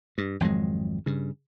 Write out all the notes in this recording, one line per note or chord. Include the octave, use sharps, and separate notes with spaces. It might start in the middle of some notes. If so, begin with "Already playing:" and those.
G2
G#1 F2 F#3 G#3
G2 C#3